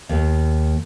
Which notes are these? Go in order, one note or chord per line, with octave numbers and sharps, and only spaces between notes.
D#2